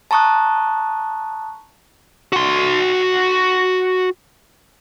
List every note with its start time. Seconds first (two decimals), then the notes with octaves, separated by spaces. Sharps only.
0.11 A5 A#5 C#6 D#6 F#6
2.33 F#4 C6